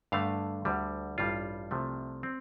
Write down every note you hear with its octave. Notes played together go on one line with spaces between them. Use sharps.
G2 D3 A3 F5
D2 D3 G3
A1 G2 G3 F4
C2 C3 F3 A3
C4